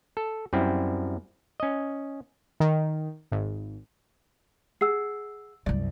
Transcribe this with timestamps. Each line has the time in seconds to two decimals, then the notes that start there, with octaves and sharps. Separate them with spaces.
0.17 A4
0.53 F#2 G3 C4 E4
1.60 C#4 D#5
2.60 D#3
3.32 G#1
4.81 G#4 F#5 E6 C7
5.66 C2 F#2 D5